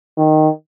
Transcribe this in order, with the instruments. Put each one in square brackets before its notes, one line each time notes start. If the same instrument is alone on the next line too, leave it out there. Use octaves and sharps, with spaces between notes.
[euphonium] D#3